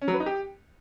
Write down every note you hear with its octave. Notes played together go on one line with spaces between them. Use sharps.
C#4
F#3
B4
D#4
G4